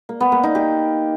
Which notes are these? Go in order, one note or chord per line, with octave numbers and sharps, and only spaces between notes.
A#3
B3
A#3
D#4
G4